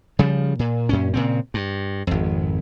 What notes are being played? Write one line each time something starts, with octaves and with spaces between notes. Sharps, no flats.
C#3 F3 G3
A#2
F#2 A#2 C#4
A#2 C#3 C4
G2
G#1 F2